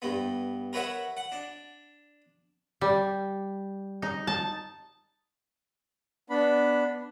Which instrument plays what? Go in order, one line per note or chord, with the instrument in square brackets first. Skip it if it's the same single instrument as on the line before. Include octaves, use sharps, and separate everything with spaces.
[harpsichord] G2 B3
A#4 B4 C#5 E5 F#5
F#5
D4
[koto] G3
D#4
A5
[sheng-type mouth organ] B3 D4 B5